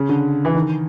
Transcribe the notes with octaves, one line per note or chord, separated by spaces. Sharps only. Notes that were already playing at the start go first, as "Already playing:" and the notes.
Already playing: C#3
D3
E3
D#3